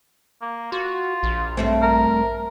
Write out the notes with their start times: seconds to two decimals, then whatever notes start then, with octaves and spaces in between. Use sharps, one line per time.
0.41 A#3
0.72 F4 F#4
1.23 A#1
1.57 G2 A3 C4
1.82 A#4